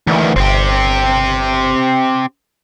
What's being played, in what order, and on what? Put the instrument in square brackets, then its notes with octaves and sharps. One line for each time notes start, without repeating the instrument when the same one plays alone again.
[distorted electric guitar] D2 D#3 [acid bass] E3
[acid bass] G1 [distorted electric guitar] C4 G4